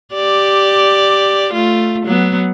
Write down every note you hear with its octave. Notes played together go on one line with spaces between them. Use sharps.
G4 D5
A3 F4
F#3 B3